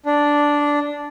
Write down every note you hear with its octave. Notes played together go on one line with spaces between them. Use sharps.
D4